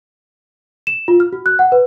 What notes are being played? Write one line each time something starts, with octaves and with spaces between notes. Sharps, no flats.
E7
F4
F6
F#4
F#6
F#5
B4